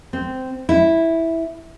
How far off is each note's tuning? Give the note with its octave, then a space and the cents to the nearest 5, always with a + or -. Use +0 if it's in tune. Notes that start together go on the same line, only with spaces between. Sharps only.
C4 -15
E4 -5